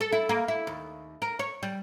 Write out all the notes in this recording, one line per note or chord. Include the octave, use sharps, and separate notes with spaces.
A4
E4
A#3
E4
D#2
A#4
C#5
G3